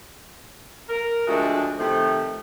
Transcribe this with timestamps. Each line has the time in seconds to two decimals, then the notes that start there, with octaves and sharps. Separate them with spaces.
0.89 A#4
1.27 D2 F3 G#3 A3 D4 F#4
1.78 C3 D#3 F3 A3